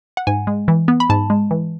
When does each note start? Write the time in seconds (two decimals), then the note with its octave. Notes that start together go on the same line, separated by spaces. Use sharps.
0.17 F#5
0.27 G#2 G#5
0.47 G#3
0.68 E3
0.88 B3
1.00 B5
1.09 G#2 A5
1.30 G#3
1.51 E3